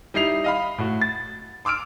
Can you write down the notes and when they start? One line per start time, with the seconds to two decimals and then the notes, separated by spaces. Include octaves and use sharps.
0.14 G3 D#4 E4 C7 F7
0.44 D#5 F5 B5
0.78 A2 F#4
1.02 A6
1.65 C6 D6 E6 F6 D7